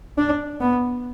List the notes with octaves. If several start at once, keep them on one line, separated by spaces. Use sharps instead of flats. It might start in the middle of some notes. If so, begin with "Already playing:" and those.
D4
B3